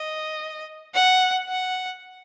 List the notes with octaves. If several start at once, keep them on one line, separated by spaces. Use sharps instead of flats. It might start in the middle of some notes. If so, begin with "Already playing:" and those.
Already playing: D#5
F#5
F#5